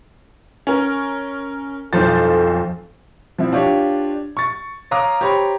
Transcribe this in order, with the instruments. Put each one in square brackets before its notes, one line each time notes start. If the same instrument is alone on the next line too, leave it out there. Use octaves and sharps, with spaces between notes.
[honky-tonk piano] C#4 A#4
[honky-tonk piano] B1 C5 A6 [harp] F2 [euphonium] A4
[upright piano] F3 C4 E4
D4 F4 G4 C#5
C#6 A6
C#5 F5 A#5 D6 D#6
G4 C5 C#5 A#5 B5